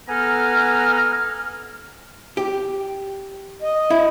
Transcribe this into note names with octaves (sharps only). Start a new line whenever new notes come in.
B3 A4 G#5 A#5 F6
G4
D#5
E4